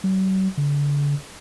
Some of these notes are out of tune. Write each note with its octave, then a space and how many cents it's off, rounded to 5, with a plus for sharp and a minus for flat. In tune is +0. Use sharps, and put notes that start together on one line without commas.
F#3 +45
D3 -35